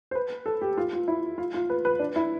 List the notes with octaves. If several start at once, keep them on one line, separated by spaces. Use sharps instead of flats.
C5
B4
A4
G4
F4
F4
E4
F4
F4
B4
B4
D4
E4